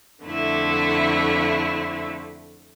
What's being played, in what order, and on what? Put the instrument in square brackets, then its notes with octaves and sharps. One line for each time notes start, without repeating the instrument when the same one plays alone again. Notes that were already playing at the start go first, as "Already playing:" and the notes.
[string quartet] F2 D3 A3 E4